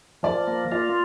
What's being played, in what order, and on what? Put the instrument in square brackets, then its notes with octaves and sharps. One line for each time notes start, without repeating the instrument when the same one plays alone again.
[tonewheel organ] F3 [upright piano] D5
[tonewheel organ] A#3
[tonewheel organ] F4 [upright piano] D5